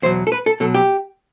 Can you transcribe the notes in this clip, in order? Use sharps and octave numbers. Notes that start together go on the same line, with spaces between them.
E2 B2 F#3 C5
A4
B4
A4
B2 F#3 A4
G4